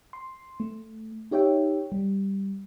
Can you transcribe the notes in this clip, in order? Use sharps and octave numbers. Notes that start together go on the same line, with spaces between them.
C6
A3
D#4 G4 C#5 E5 G5
G3